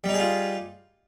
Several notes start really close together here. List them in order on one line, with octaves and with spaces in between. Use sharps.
G3 D#4 G#4 F4